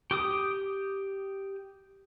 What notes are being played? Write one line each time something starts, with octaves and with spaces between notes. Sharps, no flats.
G4 D6 D#6